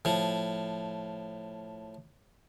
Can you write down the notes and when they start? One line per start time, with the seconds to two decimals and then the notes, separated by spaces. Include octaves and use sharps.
0.05 A2 F3